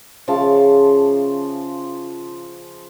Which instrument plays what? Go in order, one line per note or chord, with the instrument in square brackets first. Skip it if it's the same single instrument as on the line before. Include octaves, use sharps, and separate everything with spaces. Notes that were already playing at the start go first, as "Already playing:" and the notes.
[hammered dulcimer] C#3 F3 E5 A5